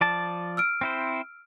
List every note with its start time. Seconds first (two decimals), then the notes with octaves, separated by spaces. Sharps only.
0.01 F3 D5 A5
0.57 E6 F6 D7
0.81 C4 E4 C5